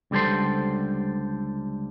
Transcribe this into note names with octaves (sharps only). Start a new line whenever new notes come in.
C#2 D3 G3 A4 C5